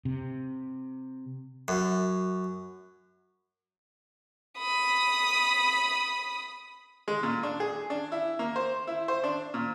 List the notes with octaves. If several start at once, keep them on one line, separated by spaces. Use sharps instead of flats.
C3
F#2
B5 D#6
G#3
A#2
D4
G#4
D4
E4
A#3
C5
E4
C5
D4
A#2